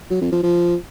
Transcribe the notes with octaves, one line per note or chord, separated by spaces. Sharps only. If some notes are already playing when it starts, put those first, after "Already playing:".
F#3
F2
F3
F3